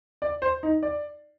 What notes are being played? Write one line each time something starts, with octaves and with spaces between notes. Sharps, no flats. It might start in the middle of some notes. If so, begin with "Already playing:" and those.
D5
C5
D#4
D5